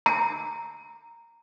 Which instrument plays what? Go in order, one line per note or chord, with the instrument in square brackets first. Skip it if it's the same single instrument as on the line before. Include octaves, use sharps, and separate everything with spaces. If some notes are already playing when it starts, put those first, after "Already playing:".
[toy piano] A#5